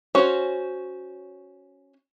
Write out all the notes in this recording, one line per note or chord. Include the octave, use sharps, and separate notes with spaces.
C#4 F#4 C5 C#5